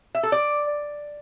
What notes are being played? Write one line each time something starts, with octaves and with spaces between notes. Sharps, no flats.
E5
A4
D5